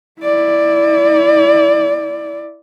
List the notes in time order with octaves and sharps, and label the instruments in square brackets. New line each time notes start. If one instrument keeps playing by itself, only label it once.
[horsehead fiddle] E4 D5